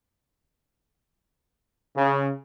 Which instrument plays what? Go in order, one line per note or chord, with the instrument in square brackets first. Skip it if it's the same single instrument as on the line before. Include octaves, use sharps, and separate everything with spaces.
[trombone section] C#3